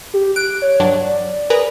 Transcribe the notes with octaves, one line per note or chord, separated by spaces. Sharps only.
G4
F#6 D7
C#5
G2 F#3 D4
D5
G#4 A#4 B4